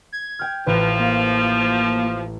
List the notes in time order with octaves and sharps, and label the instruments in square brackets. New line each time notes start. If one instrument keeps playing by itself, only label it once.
[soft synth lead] G#6
[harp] G5 F6
[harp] A1 [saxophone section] F3 [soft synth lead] B4
[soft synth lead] A#3